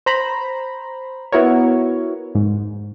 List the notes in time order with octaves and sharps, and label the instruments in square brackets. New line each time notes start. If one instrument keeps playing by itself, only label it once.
[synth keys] C5 A#5 B5
B3 E4 F#4 A#4 C#5
G#2